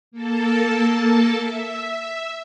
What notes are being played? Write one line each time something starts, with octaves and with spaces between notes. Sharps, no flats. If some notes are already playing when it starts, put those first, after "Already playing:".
A#3 A4 A5
E5